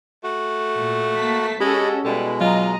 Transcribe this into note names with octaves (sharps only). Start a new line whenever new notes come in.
A3 F#4
A#2
A#3 A5 B6
G#3 C#4 F#4 G4 A4 D#5 B5
B2 G3 G#3 E4 A4 B4
F#3 F4 D#5 A#5